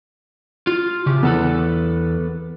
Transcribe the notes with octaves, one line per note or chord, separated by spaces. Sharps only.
F4
C#3 G4
E2 B3 A4 B4